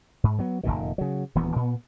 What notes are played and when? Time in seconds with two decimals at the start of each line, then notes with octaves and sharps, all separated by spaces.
0.24 G#2
0.39 F#3 B3
0.63 F1 C2 A#2 D#3
0.98 C#3 F#3
1.35 D#1 D2 E3 B3
1.56 A#2 B3